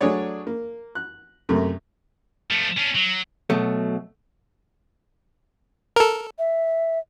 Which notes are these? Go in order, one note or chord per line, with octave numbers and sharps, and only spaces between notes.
F#3 A3 D4 G#4 C#5 D5
A#3
F#6
F#2 C3 A3 A#3
F3 A3
C#4 D4
F#3
B2 F#3 A3
A4 A#4
E5